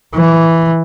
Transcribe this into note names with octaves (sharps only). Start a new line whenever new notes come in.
E3